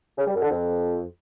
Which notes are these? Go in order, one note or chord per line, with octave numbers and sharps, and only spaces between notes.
C#3
G3
F#2
D3
F2